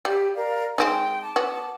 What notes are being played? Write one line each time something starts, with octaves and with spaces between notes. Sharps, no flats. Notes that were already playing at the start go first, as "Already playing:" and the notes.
G3 G4
A#4 D5 F5
G#3 C4 D#4 G5
A5 D6
B3 F#4